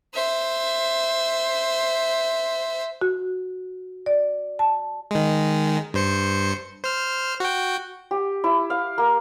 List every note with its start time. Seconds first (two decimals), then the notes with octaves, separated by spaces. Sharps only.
0.14 C5 E5
3.01 F#4
4.06 D5
4.59 A5
5.11 D#3 G#3
5.94 G2 C5 C#7
6.84 C5 F6
7.40 F#4 G5
8.11 G4
8.44 E4
8.70 F5
8.98 A#3